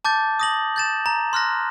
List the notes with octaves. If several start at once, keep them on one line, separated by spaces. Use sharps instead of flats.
A5 D6 G6 A6
D#6 A#6 F#7
G6 A6 E7
A#5
C6 F6 F#6 A#6